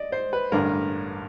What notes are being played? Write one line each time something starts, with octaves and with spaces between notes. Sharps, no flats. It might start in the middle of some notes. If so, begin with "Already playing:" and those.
Already playing: D5 D#5
C5
B4
A1 G2 D3 A#4